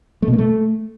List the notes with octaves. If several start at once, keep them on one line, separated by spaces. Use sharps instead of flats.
A3
B2
A#3
A3